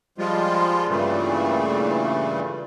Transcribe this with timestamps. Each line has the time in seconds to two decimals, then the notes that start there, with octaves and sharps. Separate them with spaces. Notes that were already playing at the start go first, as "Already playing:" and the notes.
0.18 F3 G3 G#3 F4
0.88 G2 A#2 C#3 E3 G3 A3